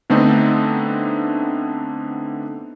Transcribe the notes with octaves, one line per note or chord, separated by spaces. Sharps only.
D3 A3 B3 C4 D4 D#4